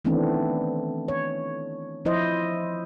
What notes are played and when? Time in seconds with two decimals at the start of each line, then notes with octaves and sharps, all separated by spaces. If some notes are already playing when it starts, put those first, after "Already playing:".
0.05 D#3 E3 A3 B3 C4 D4
1.08 C#5
2.05 F3 E4 C5 D#5